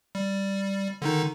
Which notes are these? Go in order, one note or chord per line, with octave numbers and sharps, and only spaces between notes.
G3
D3 D#3 D#4